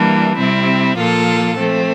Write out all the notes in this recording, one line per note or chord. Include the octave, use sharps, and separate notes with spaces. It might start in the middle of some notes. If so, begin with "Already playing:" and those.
Already playing: E3 G3 A#3 D4
C3 G3 C4 E4
A#2 F3 A#3 F4 A4
F3 A3 C4